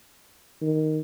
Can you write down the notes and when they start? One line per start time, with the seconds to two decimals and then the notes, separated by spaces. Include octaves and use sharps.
0.62 D#3